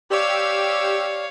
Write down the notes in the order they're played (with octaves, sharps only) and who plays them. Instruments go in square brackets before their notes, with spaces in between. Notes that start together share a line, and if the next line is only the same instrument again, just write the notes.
[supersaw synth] G4 E6 [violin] C#5 F5 [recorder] D5